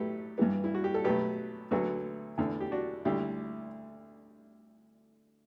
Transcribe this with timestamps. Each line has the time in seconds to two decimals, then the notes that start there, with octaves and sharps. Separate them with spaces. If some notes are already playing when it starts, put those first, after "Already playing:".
Already playing: A2 F#3 A3 G4 A4 B4
0.38 G2 E3 B3
0.64 E4
0.75 F#4
0.84 G4
0.94 A4
1.04 B2 F#3 A3 G4 B4
1.71 D2 D3 F#3 B3 F#4 A4
2.38 E2 D3 A3
2.60 G4
2.71 D4 F#4
3.05 D2 D3 G3 E4 G4